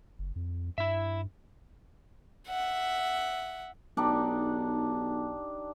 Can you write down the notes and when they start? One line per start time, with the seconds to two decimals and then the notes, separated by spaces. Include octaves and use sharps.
0.19 F#1
0.36 F2
0.78 G2 E4 E5
2.48 E5 F#5
3.97 B1 D4 D#4 G4